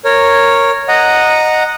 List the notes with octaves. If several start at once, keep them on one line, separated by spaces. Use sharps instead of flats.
A#4 C#5
D#5 F#5 A#5